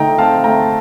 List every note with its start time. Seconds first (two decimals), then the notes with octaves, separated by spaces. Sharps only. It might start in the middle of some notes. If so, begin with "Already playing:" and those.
Already playing: D3 A3 D#4 G5 A#5
0.18 C4 F5 A5
0.44 A3 G5 A#5